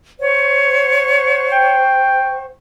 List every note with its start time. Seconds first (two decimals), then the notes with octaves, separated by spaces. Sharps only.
0.20 C5 C#5 F#5 C#6
1.52 G5